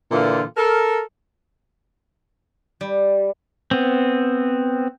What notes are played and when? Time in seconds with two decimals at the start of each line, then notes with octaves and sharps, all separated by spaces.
0.11 A#2 D3 E3 F4
0.57 A4 A#4
2.81 G3
3.71 B3 C4